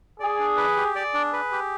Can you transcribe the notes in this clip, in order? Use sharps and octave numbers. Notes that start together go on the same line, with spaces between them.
G#4 D5
D4
B4
G4
G#4 D5
D4
B4
G4